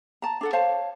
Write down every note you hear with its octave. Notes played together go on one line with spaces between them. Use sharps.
A5 A#5
D4 A4 F#5
C5 C#5 F5 A5